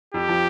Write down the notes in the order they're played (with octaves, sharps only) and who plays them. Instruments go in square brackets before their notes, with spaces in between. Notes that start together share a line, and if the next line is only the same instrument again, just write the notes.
[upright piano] F2 [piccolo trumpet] G4
[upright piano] F3